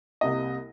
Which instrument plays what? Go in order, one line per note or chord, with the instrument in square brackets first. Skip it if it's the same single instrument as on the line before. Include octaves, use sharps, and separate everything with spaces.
[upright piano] C2 C3 G3 A#3 D#5